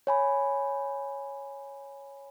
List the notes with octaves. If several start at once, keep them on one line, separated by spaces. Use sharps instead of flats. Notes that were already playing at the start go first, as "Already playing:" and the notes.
C#5 G#5 B5